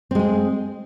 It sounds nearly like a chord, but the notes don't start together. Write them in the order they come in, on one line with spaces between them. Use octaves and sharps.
C4 G#3 G#4